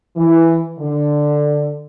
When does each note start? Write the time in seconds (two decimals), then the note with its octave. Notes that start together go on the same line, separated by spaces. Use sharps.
0.16 E3
0.79 D3